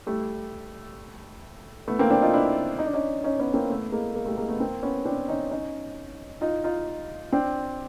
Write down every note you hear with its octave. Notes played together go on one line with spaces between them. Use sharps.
G3 A3
A3 B3
A#3 C4
C4 D4
D#4 F4
D4 E4
D#4
D4
C#4 D#4
C#4 D#4
B3 C#4
A#3 C4
A3 B3
G#3 A#3
G#3 A#3
G3 A3
G#3 A#3
A3 B3
A#3 C4
B3 C#4
C4 D4
C#4 D#4
C#4 D#4
D#4 F4
D#4 F4
C4 D4